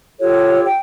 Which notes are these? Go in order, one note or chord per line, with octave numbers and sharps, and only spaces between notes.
F4 G4 A4 C#5
G5